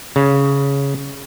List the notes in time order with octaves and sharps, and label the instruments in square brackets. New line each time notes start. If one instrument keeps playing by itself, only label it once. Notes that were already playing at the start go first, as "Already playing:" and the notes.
[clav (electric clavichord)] C#3